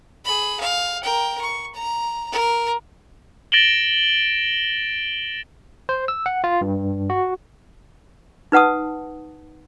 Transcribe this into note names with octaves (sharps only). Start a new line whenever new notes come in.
G#4 B5
F5
A#4 G5
C#6
A#5
A#4
A6 A#6 D7 E7 F#7 G7
C5
E6
F#5
F4
G2
F#4
D#4 B4 F#5 A5 D#6